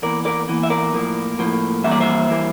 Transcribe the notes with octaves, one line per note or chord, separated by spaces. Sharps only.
E2 E3 A#3 A#4 D5
A#4 D5
E2 E3 A#3
E5
A#4 D5
A2 F3 A#3
A2 F3 A#3
G2 E3 G3 A#3 E5
D5
C5 E5
E3 G3 A#3